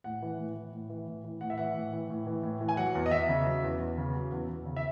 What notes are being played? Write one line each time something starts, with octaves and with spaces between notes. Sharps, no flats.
A2 F#5
E3
A2
E3
A2
E3
A2
E3
A2 F#5
E5
E3 F#5
A2
E3
A2
E3
A2
E3
G#5
F#3 F#5
E2
D#5
E2 E5
C#3
F#3
E2
E2
C#3
F#3
E2
E2
C#3
E5